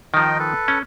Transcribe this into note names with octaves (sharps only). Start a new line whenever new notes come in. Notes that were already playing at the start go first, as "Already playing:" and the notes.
D#3 F3 D#4 D#5 G5
A4 B4
C#4